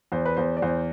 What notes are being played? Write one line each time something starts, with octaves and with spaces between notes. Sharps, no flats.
E2 C5
B4
E2 C5
D5
E2 C5